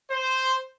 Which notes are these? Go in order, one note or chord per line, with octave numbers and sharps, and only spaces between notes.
C5